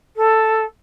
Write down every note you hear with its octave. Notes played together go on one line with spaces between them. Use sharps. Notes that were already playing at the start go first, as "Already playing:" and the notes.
A4